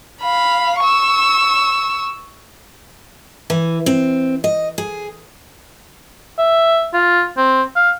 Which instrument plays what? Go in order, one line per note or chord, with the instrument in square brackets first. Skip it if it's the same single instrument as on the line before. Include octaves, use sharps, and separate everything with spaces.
[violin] F5 B5
C#6 E6
[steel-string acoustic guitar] E3
C4
D#5
G#4
[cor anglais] E5
F4
C4
F5